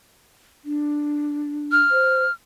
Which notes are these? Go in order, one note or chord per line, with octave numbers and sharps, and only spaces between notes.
D4
F6
C5